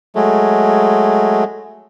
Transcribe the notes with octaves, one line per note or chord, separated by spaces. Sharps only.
F#3 G#3 A3